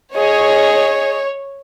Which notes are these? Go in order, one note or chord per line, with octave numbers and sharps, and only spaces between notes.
G#4 C#5 D#5